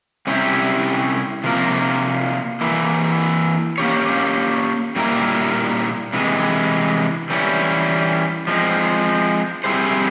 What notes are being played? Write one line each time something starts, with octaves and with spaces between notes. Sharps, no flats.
C3 G3 C#4 E4 G4
C3 F3 A#3 F4 A#4
E3 A#3 E4
A#3 C#4 G4 C#5
A#2 G3 A#3 E4 A#4
C3 E3 G#3
E3 G3 C#4 E4
F3 G#3 C4
G3 C4 E4 G#4 C5